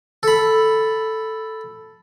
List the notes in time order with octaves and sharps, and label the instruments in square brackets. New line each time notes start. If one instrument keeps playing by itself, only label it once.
[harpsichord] A4 B5